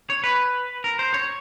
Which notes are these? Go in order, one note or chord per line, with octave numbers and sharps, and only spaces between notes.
C#5
B4
A#4
C5
C#5